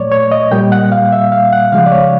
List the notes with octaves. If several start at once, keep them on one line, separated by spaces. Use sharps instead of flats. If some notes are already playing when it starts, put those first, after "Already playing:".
Already playing: A#2 F#3 A3 C#5 D5
C#5
D#5
A#2 G3 A#3 G5
F#5
F5
E5
F5
F#5
C#3 F3 G#3 F5
D5
C#5